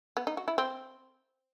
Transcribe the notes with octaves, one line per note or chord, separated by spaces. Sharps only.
B3
D#4
F#4
E4
C4